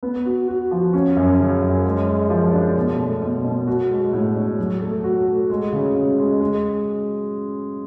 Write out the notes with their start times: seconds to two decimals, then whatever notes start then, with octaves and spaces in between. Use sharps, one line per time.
0.03 B3
0.25 F#4
0.48 F#4
0.71 F3
0.93 C#4
1.17 F#2
1.39 C#3
1.62 F#2
1.85 G#3
2.07 G#3
2.30 F3
2.53 D4
2.76 B2
2.99 A3
3.22 B2
3.45 B2
3.67 F#4
3.90 G#3
4.13 A2
4.36 D4
4.58 F#3
4.81 A3
5.04 F#4
5.27 A3
5.50 G#3
5.73 C#3
5.95 C#3
6.18 G#3
6.40 G#3